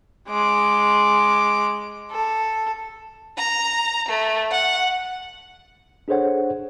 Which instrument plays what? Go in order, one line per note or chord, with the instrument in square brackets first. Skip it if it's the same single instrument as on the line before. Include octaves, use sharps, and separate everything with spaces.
[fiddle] G#3 D6
A4
[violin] A#5
A3
F#5
[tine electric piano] D4 G#4 A4 C5 C#5 F#5